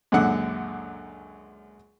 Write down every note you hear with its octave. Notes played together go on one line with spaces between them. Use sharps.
C#2 F#2 A#2 D3 F#5